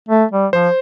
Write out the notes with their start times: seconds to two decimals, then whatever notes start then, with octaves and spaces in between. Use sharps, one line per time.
0.09 A3
0.31 G3
0.53 F3 C5